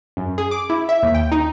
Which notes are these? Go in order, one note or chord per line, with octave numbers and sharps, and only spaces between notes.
F#2
G#4
D6
E4
E5
D#2
G5
D#4